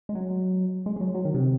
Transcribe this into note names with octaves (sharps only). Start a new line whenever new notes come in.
G#3
F#3
G#3
G#3
F#3
F#3
D#3
C3